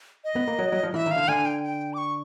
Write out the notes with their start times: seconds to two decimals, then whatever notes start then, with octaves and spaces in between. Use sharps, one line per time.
0.24 D#5
0.36 B3
0.48 A#3
0.59 F#3
0.72 F#3
0.83 F3
0.94 E3 E5
1.06 D#3
1.11 F5
1.16 D3
1.28 D3 G#5
1.45 G5
1.63 G5
1.93 D6
1.98 C#6